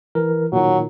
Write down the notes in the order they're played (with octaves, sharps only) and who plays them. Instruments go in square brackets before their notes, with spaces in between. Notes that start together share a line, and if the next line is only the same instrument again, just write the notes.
[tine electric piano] E3 A#4
[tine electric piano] A#2 D#3 [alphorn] F#3